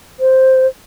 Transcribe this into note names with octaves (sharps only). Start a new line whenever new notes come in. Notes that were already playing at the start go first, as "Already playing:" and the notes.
C5